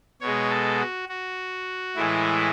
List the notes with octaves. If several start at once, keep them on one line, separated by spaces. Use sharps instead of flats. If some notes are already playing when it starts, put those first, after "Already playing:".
B2 G#3 C#5
A4
F#4
F#4
A2 E3 G#3 E4